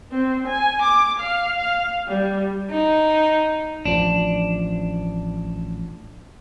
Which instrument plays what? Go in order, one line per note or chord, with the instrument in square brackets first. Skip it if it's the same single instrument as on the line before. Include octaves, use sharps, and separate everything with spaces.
[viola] C4
G#5
D6
F5
F5
G3
[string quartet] D#4
[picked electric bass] A1 F3 [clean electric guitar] D4